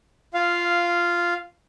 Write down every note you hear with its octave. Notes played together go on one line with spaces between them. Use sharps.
F4 F5